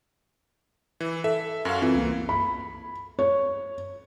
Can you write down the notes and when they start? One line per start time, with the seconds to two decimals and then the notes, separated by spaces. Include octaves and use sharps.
1.00 E3
1.24 A4 E5
1.65 F#2 F#4 F5
1.82 E3 C4 F4
1.95 C2 A#3
2.29 B5
3.19 C#5